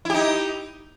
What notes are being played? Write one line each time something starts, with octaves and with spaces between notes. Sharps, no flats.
D#4 E4 G4